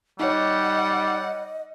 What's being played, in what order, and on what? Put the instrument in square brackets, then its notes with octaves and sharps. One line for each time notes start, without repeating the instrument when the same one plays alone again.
[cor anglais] G3 [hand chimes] D#4 C#5 [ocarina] D#5 [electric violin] F#5